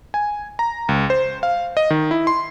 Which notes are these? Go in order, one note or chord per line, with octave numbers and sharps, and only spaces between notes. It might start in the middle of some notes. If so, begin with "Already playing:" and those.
G#5
A#5
C#2
C5
F5
D#5
D#3
E4
C6